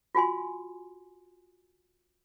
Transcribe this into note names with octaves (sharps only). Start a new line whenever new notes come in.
F4 F#4 G#5 C6